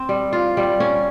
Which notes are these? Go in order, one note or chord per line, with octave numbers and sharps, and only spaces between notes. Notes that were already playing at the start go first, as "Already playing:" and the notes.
Already playing: C4
G3
F4
G3
C#4